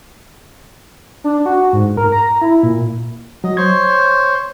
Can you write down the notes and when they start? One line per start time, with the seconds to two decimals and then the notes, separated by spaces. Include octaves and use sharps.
1.24 D4
1.46 F#4
1.73 G#2
1.97 A#4
2.12 A#5
2.42 E4
2.63 A#2
3.44 F#3 D#5
3.57 C5 C#5 G#6